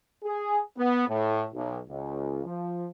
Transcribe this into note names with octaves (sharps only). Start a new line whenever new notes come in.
G#4
B3
A2
B1
C#2
F3